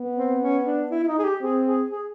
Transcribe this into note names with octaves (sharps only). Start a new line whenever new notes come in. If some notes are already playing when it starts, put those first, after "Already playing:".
Already playing: B3
C4
C#4
D4
E4
E4
D#4
G#4
G4
C4 G#4
G#4
G#4